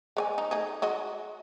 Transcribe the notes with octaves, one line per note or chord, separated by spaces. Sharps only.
G#3 C#5 G#5
D#4
A3 D#4 G#4
G#3 F#4 D#5